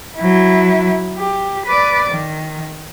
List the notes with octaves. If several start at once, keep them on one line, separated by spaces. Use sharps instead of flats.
F#3 E4
G4
B4 D5
D#3